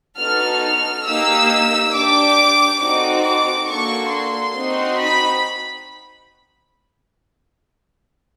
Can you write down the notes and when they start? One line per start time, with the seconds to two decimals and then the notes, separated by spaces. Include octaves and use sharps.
0.19 B3 D#4 F#4 A4 F6
0.63 F6
1.07 A#3 D#4 G4 E6
1.94 D4 G4 D6
2.81 C4 D#4 F#4 A4 D6
3.25 D6
3.70 A#3 D4 F#4 A4 C#6
4.12 C6
4.56 C4 D#4 F#4
5.01 B5